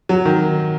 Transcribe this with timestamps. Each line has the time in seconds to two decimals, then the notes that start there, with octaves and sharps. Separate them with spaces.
0.09 F#3
0.25 D#3